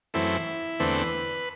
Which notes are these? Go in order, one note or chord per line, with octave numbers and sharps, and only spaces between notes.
F#2 E3 A3 C4 E4
E2 D3 A3 C4 B4